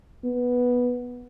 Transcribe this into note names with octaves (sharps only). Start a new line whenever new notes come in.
B3